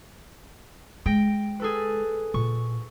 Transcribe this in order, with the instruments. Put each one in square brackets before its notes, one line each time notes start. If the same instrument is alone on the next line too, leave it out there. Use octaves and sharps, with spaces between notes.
[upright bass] G#3 [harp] G5 A#6 D7
[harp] G#4 A4 B4
[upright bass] A#2 [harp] C#6